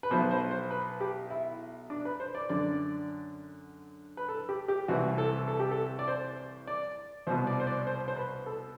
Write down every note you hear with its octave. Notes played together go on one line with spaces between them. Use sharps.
B4
B1 B2 C5
C5
C5
B4
G4
E4
D4
B4
C5
D5
F#2 D3 D5
B4
A4
G4
G4
C2 C3 E3 F#4
A4
A4
G4
A4
D5
C5
D5
C2 B2 C5
D5
C5
D5
C5
C5
B4
A4